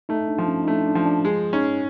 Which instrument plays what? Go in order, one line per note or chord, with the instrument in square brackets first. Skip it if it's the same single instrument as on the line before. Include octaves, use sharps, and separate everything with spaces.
[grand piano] A3 [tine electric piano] D#4
[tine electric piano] D4
[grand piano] F3
[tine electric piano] C#4
D#4
[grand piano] A3 [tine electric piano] D4
[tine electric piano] D4
[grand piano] F3
[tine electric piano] D4
[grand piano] G#3
[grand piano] C#4 [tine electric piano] D#4